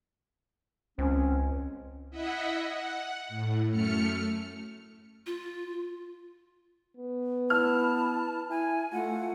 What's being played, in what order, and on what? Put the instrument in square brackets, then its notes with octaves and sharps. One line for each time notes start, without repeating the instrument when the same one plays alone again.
[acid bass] C#2 [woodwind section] C4 C#4
[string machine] E4 D#5 E5 F#5
F#5
A2
F#2 A3 F6 C#7
[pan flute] F4
[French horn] B3
[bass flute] E4 [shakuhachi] A5 [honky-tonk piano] F6
[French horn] E4 [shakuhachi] G#5
[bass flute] A3 [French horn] F4 [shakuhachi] F#5